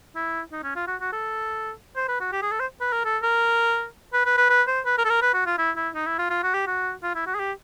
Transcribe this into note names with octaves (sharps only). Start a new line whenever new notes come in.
E4
D#4
C#4
F4
F#4
F#4
A4
C5
B4
F#4
G4
G#4
A4
C5
B4
A#4
A4
A#4
B4
B4
B4
B4
C5
B4
A#4
A4
A#4
B4
F#4
F4
E4
E4
D#4
E4
F4
F4
F#4
G4
F#4
F4
E4
F#4
G#4
G4